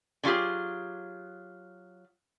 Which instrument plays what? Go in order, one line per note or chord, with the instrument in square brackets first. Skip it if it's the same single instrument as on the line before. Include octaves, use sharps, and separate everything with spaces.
[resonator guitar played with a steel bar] D3 F#3 F4 G4 G#4